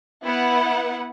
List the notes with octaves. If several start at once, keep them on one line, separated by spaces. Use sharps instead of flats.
B3 E4 B4 F#5